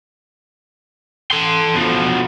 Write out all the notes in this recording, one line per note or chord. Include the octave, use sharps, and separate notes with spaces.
A4 C6
B2 F3